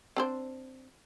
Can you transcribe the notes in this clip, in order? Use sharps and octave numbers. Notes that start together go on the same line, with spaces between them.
C4 D4 C5